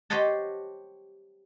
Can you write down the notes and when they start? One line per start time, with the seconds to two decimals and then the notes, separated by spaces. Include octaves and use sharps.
0.10 G4 C5 C#5 D#5 F#5 A5